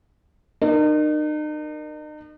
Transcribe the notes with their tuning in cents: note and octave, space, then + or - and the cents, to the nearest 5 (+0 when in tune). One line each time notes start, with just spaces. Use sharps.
D#4 -40 A#4 +0